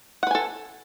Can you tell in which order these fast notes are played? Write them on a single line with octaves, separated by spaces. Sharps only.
F#5 B4 G#5 A4